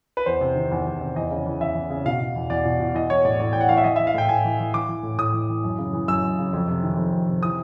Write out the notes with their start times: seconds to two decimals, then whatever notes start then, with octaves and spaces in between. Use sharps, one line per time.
0.17 B4
0.26 E2 C5
0.41 C3
0.56 D#3
0.71 E2
0.86 E2
1.01 C3
1.16 E2 D#5
1.31 C#3
1.46 E3
1.61 E2 E5
1.75 E2
1.90 C#3
2.06 B2 F5
2.21 B2
2.36 E2
2.50 E2 D5
2.65 B2
2.80 B2
2.94 E3 D#5
3.10 E3 C#5
3.25 A2 D5
3.40 A2 D5
3.53 E3 G5
3.60 F#5
3.69 E3 F5
3.77 E5
3.84 E3 D#5
3.96 E3 E5
4.07 F5
4.14 A2 G5
4.29 A2 G#5
4.45 E3
4.60 E3
4.74 E3 D6
4.89 E3
5.03 A2
5.18 A2 D#6
5.33 E3
5.49 E3
5.64 F#2
5.78 C#3
5.93 E3
6.08 F#2 E6
6.24 F#2
6.39 C#3
6.53 F2
6.68 C3
6.83 D#3
6.97 F2
7.13 F2
7.27 C3
7.42 E3 D#6